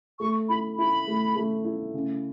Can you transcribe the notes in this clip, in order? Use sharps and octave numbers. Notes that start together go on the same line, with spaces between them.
A3 C#6
E4 B5
E4 B5
A3
A3
E4
C#3